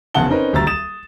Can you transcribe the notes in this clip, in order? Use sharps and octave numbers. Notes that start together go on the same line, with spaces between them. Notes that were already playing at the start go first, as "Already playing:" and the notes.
F1 E2 C#3 F#5 A5 G7
C4 C#4 D#4 A#4 B4
D#1 D2 F#3 A#5 E6 A6
D#6 A6 E7